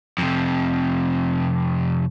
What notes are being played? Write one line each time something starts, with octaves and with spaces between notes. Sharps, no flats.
F2 C3